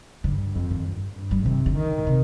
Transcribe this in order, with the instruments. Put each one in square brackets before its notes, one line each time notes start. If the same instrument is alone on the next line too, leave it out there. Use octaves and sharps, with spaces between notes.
[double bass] G2 [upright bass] D3
[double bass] F2 [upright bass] D#3
[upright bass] D#3
[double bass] G2
G2
[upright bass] G3
[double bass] C3 [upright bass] D#3
[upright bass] D3
[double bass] D#3
[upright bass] C3